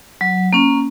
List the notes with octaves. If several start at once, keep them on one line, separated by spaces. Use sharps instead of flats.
F#3
A#3 C#4